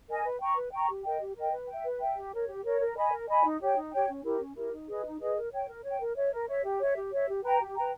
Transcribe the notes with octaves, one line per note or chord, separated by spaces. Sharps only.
A#4 D#5 G#5
B4
G5 A#5 C#6
B4
G5 A#5 C#6
G4
A#4 D#5 G5
G4
A#4 D#5 G5
B4
E5 G5
B4
E5 G5
G4
A#4 C#5
G4
A#4 C#5
A#4
D#5 G#5 B5
A#4
D#5 G#5 B5
D#4
G4 C#5 G5
D#4
G4 C#5 G5
C#4
E4 G4 A#4
C#4
E4 G4 A#4
D#4
G#4 B4 D#5
D#4
G#4 B4 D#5
A#4
C#5 G5
A#4
C#5 G5
A#4
C#5 E5
A#4
C#5 E5
G4
C#5 E5
G4
C#5 E5
G4
B4 G5 A#5
G4
B4 G5 A#5